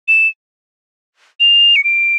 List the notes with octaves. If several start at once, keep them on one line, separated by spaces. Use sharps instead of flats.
E7
F7
C#7
D7